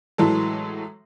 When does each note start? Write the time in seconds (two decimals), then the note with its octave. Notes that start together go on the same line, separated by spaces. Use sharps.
0.18 A2 E3 F#3 G#3 A4